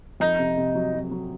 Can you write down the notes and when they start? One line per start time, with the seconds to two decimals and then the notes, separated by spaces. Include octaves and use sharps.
0.20 F2 D#4
0.39 C3
0.57 C3
0.75 F#3
0.94 F#3
1.11 F#3